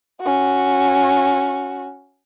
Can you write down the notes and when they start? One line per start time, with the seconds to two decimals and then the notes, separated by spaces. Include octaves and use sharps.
0.21 C#4 F#4